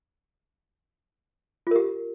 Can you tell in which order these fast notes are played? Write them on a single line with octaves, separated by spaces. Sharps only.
F4 A#4 G4